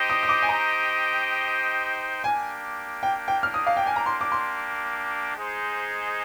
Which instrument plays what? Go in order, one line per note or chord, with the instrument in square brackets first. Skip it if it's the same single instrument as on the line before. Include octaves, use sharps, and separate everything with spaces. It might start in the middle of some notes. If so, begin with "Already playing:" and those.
Already playing: [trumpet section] D#4 G4 C5 D#5 G5
[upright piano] D#6
D#6
D6
G#5
A#5
[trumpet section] A#3 D4 G4 [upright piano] G#5
[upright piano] G5
G5
F6
D#6
F5
G5
G#5
A#5
C6
D6
C6
[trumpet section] G#3 D#4 G#4 C5